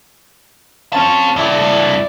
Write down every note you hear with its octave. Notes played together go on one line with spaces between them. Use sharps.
C4 C#4 A5
G2 E4 D5